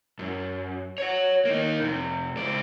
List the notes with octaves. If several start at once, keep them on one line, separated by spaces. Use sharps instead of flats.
F#2
C#5 F#5
A#3 D#4
F2 C3
C#2 D5